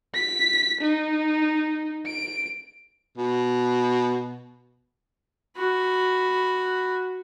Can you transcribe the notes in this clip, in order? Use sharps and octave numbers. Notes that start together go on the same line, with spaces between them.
B6
D#4
D7
B2
F#4 B5